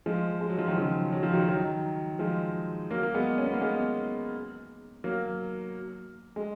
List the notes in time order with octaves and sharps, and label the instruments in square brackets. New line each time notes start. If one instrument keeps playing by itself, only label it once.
[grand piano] F3 G#3
G#3
F#3
F3
D#3 F#3
C#3 F3
F#3
F3
D#3 F#3
D#3 F#3
F3 G#3
F#3 A#3
A#3
G#3 B3
C#4
B3
A#3
G#3 B3
F#3 A#3
G#3